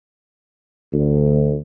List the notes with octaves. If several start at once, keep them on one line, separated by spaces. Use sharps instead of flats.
D2